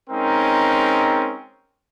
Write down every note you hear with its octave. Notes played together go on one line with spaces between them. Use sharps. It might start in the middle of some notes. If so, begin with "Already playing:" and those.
G#3 C4 C#4 D#4 A#4